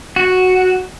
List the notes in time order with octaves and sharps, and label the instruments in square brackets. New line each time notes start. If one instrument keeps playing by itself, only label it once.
[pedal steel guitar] F#4